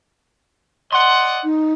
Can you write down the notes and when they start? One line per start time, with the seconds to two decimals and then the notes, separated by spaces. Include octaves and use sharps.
0.92 D5 D#5 F#5 C6
1.44 D#4